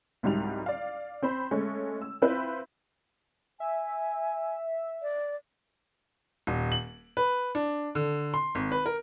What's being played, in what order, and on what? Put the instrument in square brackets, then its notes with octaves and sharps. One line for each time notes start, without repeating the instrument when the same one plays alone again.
[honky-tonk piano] C2 G#2 F#3 G3 D#4 F7
D5 F5
C4 C5 B5
G#3 A3 C#4
E6
C4 E4 F4 B4 C5 E5
[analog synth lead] E5 [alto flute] G#5
[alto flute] D5
[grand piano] D#1
F#7
B4
D4
D3
C6
G#1
B4
A#4